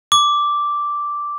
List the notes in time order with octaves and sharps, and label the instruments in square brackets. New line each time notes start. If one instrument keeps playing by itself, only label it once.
[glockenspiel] D6